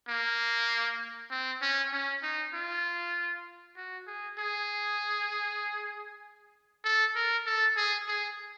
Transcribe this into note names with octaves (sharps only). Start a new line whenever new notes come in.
A#3
C4
C#4
C#4
D#4
F4
F#4
G#4
G#4
A4
A#4
A4
G#4
G#4